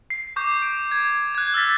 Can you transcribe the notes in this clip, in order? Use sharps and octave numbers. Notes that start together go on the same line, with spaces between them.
C7
C#6 D6 G6
D7
G#6
F#6 G#6
E6 F6 A6 B6